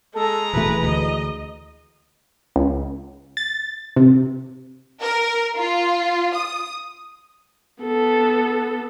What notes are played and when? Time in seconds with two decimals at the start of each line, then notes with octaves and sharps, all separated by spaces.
0.14 G#3 A4 A#5
0.53 D#1 B2 E3 A3 B4
0.84 D2 D#5
2.56 C#2
3.37 A6
3.96 C3
5.00 A#4
5.55 F4
6.34 D#6
7.83 B3 A4